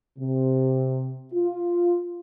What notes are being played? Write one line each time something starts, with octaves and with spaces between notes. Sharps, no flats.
C3
F4